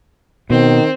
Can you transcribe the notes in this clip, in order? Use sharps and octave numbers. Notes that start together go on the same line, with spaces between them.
B2 D#3 C4